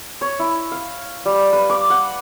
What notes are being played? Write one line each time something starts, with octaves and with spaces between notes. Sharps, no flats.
C#5
E4
F5
G3
B4
D6
F#5